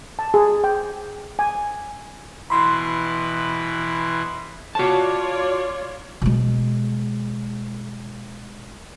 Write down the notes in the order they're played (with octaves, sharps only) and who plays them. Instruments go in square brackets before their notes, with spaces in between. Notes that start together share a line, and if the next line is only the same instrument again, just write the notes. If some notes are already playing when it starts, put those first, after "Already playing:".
[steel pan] A5
G#4
G5
G#5
[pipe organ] B2 E3 E4 [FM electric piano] B5 C6
[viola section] F4 C#5 D5 [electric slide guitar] F#4 A5
[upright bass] B2 G#3